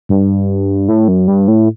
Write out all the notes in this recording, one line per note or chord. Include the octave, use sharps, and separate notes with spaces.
G2
A2
F#2
G2
A2